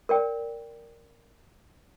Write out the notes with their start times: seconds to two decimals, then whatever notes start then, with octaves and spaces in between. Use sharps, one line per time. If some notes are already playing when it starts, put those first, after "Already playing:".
0.09 A#4 D5 G5